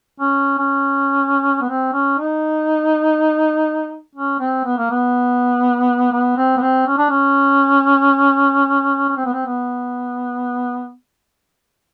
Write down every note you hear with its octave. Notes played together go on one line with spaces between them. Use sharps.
C#4
C#4
B3
C4
C#4
D#4
C#4
C4
B3
A#3
B3
B3
C4
B3
C4
C#4
D4
C#4
C#4
C4
B3
C4
B3